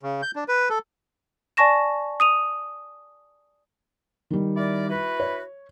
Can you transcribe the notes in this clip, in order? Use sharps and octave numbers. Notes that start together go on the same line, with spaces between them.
C#3
G6
D4
B4
A4
D5 G#5 A5 C#6 A#6 E7
D#6 D#7 F7
D#3 G3
E4 A#4 D5
E4 F#4 B4
C#5